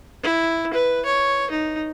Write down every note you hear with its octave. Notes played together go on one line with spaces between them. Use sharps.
E4
B4
C#5
D#4